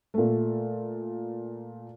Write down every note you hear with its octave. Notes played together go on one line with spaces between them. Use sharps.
A#2 A3